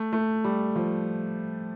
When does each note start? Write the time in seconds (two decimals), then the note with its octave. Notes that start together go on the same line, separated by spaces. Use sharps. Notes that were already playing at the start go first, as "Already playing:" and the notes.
Already playing: A3
0.13 A3
0.44 G3
0.76 F3